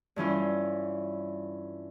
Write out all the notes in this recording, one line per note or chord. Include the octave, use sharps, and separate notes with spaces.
G2 E3 C#4 F4